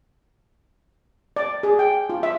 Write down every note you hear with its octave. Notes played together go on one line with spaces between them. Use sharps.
D5
G#4
G5
F4
E5